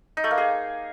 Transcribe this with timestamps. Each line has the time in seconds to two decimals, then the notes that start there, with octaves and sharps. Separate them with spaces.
0.17 D#4
0.24 A3
0.31 A#3
0.38 G#4